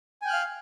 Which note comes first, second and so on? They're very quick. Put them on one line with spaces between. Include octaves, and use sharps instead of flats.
G#5 G5 F#6 F6 F5